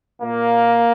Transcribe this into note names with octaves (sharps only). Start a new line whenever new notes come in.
A#2 A#3